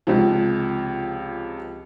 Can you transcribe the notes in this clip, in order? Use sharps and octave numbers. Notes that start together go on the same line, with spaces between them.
C#2 C3 F3